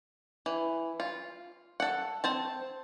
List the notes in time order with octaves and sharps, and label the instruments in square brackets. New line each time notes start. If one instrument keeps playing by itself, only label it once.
[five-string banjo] E3
F4
A4 F#5
C4 C5 A5